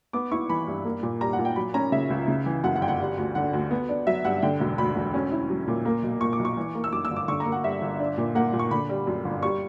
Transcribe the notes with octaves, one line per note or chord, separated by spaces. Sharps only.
B3 D6
E4 C#6
E3 B5
G2
A#3
A#2
G3 A#5
F#5
A#2
G5
F#3 B5
C#4 A#5
C#3 E5
C#2
C#3
E3
F#2 F#5
F#5
G1 G5
F#5
G3
D2
D3 F#5
D2
B3
D4
F#3 E5
G2 F#5
D3 G5
E1
D2 B5
E1
C#4
E4
F#3
A#2
A#3
B1
A#2 C#6
D6
B1
C#6
E3
A#3
E6
F#2 D6
E6
G1
D6
D3 C#6
A#5
A#3
F#5
G2 E5
G1
D4
A#2
A#3 F#5
A#2
C#6
D3 B5
G3
F#2
G1
G3 C#6